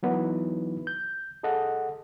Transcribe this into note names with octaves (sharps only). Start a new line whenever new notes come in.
E3 F#3 B3 D#4 E4 B4
G6
G#4 A4 D#5 F#5